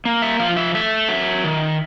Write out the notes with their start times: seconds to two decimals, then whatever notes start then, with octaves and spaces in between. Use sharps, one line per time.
0.05 A#3
0.22 E5
0.40 F3 F5
0.57 E5
0.74 A3 E5
1.08 F#3
1.44 D#3